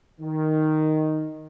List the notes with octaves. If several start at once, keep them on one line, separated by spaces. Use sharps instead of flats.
D#3